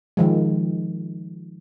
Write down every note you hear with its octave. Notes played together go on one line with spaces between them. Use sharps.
D#3 F3 G#3